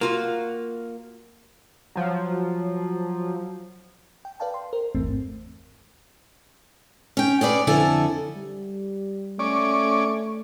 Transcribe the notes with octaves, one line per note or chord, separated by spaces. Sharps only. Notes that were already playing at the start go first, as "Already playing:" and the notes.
A#3 F4 F#4
F3 F#3
G5
B4 D5 F5 G5 A5
C6
A#4 C5
G#1 E2 G#2 E3 A3 C4
C#4 G5
C#4 G#4 B4 D5
F2 D3 E4 A4 G#5
G3
A3 C#4 D5